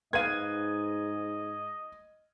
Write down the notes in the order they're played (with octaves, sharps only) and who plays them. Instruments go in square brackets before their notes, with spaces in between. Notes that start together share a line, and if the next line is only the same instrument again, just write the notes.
[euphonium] G#2 [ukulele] B4 F5 [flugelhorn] D#5 [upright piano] G#6 D#7